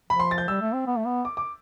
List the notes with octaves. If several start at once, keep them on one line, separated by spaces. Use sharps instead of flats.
F3 B5
C6
A6
G6
G3 E6
A3
C4
B3
A3
B3
D6
D6